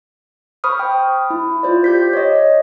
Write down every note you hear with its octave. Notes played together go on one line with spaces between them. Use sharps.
C5 B5 C#6 D#6 F6
G5
E4
F4 C5 D5
G4 G6 B6
C#5 D#5